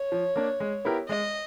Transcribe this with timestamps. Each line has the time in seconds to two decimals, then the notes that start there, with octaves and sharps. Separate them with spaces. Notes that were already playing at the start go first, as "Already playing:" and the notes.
Already playing: C#5
0.12 F3
0.36 A#3 D4
0.60 G#3
0.85 B3 E4 G4 A#4
1.09 G#3 D#5